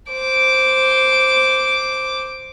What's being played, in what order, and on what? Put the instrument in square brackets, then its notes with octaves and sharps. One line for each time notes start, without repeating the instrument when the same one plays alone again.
[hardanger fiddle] C5 D6